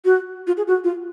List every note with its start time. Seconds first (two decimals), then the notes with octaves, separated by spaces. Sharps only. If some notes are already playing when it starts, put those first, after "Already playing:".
0.05 F#4
0.47 F4
0.57 G#4
0.68 F#4
0.84 F4